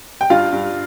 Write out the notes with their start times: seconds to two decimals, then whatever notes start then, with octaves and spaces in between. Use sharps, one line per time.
0.21 G5
0.30 G2 F4 F5
0.52 G2